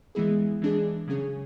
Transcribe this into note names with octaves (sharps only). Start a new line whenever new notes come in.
E3 G#3 B3 E4 G#4
E3 G#3 D4 G#4
C#3 F#3 C#4 G#4